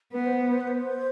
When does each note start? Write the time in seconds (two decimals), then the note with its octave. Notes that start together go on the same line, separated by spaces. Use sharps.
0.13 B3 B4
0.26 C5
0.40 B4
0.53 C5
0.61 B4
0.68 C5